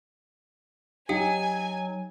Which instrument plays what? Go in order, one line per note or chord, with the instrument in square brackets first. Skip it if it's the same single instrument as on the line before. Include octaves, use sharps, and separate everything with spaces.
[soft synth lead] F#3 [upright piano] D#4 [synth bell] G4 F5 G5 [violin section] G#5